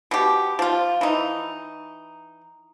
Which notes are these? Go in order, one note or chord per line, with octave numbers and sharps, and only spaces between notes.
B2 G4
F3 F4
E3 D#4